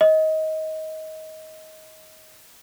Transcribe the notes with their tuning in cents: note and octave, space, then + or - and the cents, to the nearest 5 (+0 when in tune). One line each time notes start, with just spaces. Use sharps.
D#5 +20